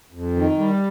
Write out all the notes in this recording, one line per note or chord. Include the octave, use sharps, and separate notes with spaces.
F2
D#3
G3